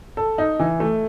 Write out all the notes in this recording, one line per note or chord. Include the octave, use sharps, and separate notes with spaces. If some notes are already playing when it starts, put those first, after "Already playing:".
A4
D#4
E3
A3